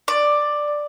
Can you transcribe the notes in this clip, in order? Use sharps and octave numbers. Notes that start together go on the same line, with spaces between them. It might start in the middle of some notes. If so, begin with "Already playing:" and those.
D5